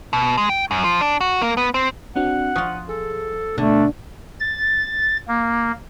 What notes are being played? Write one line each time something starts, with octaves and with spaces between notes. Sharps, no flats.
B2
G#3
G5
F#2
F3
D4
F#4
A#3
B3
C4
C4 D4 F#4 F#5
F3 F4 C#6 D#6 F#6
G#4 A4
B2 D3 A3 D4
A6
A#3